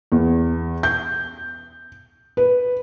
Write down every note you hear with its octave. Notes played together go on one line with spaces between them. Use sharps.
E2
G6
B4